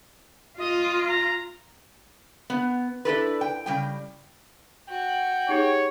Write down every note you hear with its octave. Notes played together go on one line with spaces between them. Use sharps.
F4 D#5
A#5
B3
D4 E4 A4 B4
G5
C#3 G3 G5
F#4 G5
D#4 G4 G#4 C#5